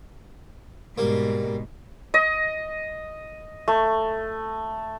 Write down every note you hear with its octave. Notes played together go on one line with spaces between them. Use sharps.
G#2 B2 G3 A#3
D#5
A3